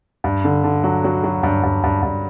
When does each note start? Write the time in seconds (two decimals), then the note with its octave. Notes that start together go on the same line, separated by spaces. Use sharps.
0.24 G2
0.44 D3
0.64 D3
0.84 F#3
1.04 F#3
1.24 F#3
1.43 G2
1.63 G2
1.84 G2
2.02 G2